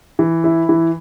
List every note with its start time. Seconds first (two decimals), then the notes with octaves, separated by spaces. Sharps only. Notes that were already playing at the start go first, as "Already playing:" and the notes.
0.19 E3
0.44 E4
0.69 E3